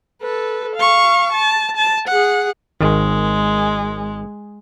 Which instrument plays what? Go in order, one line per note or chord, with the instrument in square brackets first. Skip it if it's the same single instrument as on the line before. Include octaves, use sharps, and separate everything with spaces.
[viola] A4 B4
F5 C#6
A5
A5
G#4 F#5
[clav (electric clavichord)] G#1 D#3 [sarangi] G#3